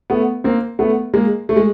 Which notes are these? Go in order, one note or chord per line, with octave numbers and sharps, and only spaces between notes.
A3 B3
A#3 C4
A3 B3
G#3 A#3
A3
G#3